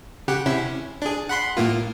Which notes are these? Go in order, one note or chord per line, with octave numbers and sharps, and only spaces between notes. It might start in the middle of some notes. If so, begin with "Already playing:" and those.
C#3 G4 F#5
C3 C#4 E4
D4 G#4
F#5 B5 C6
A2 A#3 F4